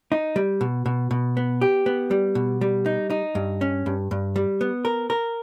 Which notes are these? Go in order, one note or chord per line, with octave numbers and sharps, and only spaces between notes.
D#4
G3
B2
B2
B2
B3
G4
B3
G3
B2
G3
D#4
D#4
G2
C#4
G2
G2
G3
B3
A#4
A#4